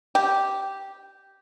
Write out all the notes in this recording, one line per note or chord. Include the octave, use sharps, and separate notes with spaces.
G4